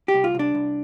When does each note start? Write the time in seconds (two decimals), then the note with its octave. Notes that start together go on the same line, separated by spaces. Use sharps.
0.08 G4
0.14 C2
0.24 F4
0.35 C2 D4
0.55 C2